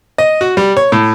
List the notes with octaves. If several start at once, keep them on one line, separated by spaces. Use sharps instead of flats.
D#5
F#4
G3
C#5
A2